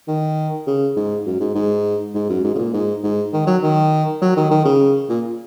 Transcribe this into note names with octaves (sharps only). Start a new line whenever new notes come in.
D#3
C#3
G#2
F#2
G#2
G#2
G#2
F#2
G#2
C#3
A#2
G#2
G#2
D#3
F#3
D#3
F#3
D#3
D#3
C#3
A#2